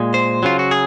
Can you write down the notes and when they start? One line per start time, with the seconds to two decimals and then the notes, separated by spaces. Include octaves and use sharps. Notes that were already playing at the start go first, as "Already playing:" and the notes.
Already playing: A#2 G#3
0.14 C5
0.43 C#3 F#3 F4
0.59 F#4
0.71 G#4